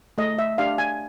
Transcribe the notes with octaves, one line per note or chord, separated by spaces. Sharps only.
A3 D#5
E5
D4 G4 F5
G#5